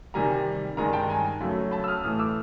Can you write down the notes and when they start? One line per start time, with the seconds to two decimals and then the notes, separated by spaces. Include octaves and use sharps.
0.14 C3 D#3 G3 G#5 A#5
0.77 G2 D#3 G#3 G#5 A#5
0.93 G5 A5
1.09 G#5 A#5
1.40 F#2 C#3 F#3 A3
1.71 A5 B5
1.84 E6
1.87 D#6 F6
2.04 A2 E3 A3 D#6 F6
2.19 D6 E6